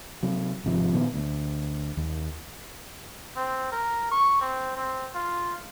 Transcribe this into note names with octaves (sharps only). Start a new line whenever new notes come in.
C3 F#3
G#1 C3 F3
A#2 D#3 A#3 B3
D2
D#2
C4
A#4
C#6
C4
C4
F4